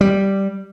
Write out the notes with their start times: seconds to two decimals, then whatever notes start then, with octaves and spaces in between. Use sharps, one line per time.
0.01 G3